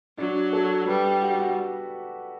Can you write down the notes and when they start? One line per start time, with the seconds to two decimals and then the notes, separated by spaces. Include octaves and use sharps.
0.18 F#3 D4
0.53 A4
0.87 G3 B4
1.05 G4
1.22 F#4
1.39 F#4